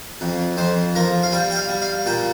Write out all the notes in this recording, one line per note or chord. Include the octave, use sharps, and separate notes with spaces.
F2
F2 C5
F3 A#4
F5
G3 G5
G5
F5
G3
F5
A#2 G5